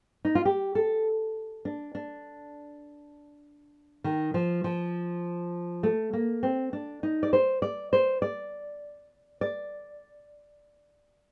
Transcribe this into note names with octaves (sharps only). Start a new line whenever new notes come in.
D#4
F4
G4
A4
D4
D4
D#3
F3
F3
A3
A#3
C4
D4
D#4
D5
C5
D5
C5
D5
D5